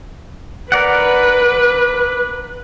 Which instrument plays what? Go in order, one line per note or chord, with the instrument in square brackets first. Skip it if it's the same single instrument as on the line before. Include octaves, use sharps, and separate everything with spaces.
[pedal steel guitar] A#4 D5 F#5 [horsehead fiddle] B4